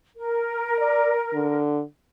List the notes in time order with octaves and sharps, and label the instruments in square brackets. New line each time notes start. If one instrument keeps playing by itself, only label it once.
[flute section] A#4
[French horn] D5
D3